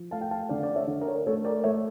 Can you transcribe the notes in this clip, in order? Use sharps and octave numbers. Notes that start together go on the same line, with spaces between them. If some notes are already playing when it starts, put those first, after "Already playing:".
Already playing: F3
A3 F5 A5
G5
F5 A5
D3 D5 F5
D5
C#5 E5
D3
A#4
C#5
A#4
A3 A4 C#5
A#4 D5
A3 C#5 E5